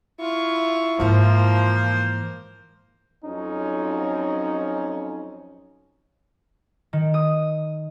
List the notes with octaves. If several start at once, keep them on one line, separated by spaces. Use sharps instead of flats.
E4 F4 C#6
G#2 E3 F3 A#3 C5
F2 F#3 C#4 D#4
D#3
D#6